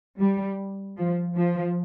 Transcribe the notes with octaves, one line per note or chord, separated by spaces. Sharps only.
G3
F3
F3